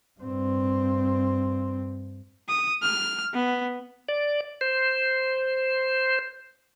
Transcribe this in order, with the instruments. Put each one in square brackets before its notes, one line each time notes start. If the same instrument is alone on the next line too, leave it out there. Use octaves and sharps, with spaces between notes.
[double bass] G2 C4
[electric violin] D#6
F6
B3
[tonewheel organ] D5
C5